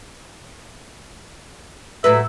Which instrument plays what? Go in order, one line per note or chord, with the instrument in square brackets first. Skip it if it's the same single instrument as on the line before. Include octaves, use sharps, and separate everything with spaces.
[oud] A2 F#3 B4 [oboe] E5